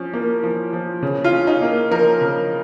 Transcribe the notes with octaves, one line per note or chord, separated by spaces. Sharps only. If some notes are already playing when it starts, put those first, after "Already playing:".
Already playing: F3 C#4
A#3
F3
F3
C#3
F4
C#4
D#4
A#3
F3 A#4
C#3